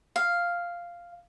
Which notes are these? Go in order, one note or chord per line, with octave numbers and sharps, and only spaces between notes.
F5